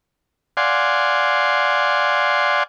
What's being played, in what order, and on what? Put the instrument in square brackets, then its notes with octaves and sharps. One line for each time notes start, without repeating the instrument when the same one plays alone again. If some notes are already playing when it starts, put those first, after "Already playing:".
[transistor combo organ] D5 F5 F#5 G#5 C6